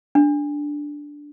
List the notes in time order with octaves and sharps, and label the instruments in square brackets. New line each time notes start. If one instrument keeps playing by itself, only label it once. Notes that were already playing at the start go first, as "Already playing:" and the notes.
[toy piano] D4